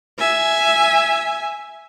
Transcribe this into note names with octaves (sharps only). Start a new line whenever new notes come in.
E5 G#5